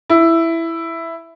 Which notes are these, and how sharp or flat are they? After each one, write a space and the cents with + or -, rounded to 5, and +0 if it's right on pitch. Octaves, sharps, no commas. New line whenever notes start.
E4 +5